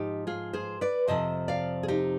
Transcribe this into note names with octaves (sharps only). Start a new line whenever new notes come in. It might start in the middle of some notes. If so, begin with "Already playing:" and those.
Already playing: G#2 F3 D#4 G4
F4 G#4
G#4 C5
B4 D5
F2 C3 F3 C5 D#5
D5 F5
G#4
D#4 G4